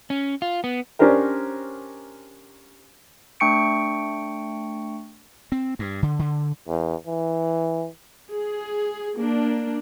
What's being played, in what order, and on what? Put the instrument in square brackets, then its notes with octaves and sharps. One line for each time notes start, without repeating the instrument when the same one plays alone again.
[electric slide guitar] C#4
F4
B3
[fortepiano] C#4 D4 G4 A#4 C5
[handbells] A3 D4 G5 C#6 C#7 D7
[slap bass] C4
G2
D3
D3
[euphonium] E2
E3
[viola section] G#4
A#3 D4